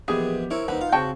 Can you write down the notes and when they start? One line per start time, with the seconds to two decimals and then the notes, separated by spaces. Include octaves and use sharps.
0.08 A#1 E3 G#3 B3 G4 G#4
0.51 C4 E4 A#4 C#5
0.68 D#2 G3 C4 D#4 B4 F#5
0.81 F4 F5
0.92 C#3 C4 F#4 G#4 C5 G5 A5